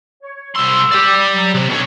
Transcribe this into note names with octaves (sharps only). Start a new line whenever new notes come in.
C#5
C2 C6 E6
G4 D5
F#3
C3
B2 C4 D4 A4 C#5